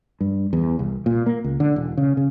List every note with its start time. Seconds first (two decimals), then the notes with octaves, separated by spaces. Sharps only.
0.21 G2
0.53 E2
0.79 C2
1.06 A#2
1.26 A#3
1.44 C#2
1.60 D3
1.76 E1
1.97 C#3
2.17 C#3